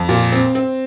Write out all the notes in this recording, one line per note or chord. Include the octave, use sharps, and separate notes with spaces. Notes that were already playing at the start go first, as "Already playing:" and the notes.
Already playing: F2
A#2
C4
C4